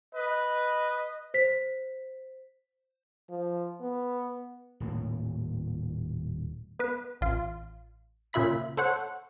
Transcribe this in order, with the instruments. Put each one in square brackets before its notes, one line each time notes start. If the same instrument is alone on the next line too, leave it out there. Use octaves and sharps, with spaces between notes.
[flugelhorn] B4 [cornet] D#5
[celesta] C5 B6
[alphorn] F3
B3
[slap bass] D#1 A2 A#3
[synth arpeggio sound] B3 B4
A1 F4
A#2 C#3 F4 E5 B5 B6
A4 C5 C#5 F#5